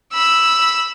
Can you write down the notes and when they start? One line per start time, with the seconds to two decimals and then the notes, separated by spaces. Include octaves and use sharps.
0.13 B5 E6